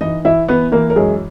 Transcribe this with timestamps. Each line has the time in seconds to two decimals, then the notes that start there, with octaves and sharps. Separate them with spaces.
0.01 E3 D#4 D#5
0.25 E3 E4 E5
0.48 E3 B3 B4
0.72 E3 A#3 A#4
0.90 A#4
0.96 F#2 G#3 G#4